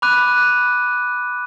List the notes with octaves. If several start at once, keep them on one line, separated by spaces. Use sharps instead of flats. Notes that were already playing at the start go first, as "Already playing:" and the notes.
B5 D6 F#6 D#7